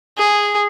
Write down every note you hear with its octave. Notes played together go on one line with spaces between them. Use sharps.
G#4